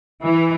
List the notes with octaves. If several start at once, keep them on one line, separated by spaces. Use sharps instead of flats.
E3